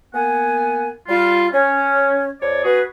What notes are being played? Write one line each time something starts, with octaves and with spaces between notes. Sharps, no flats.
A#3 B3 F#5 G#5
G3 F4
C#4
F2 C#5 D5
B3 F#4 G#4 B4